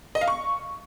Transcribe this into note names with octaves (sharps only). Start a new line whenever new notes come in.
D#5
F5
C#6